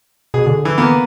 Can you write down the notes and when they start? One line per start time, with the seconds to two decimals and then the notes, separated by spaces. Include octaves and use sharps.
0.34 B2 G#4
0.46 D3
0.65 E3
0.78 A#3 B3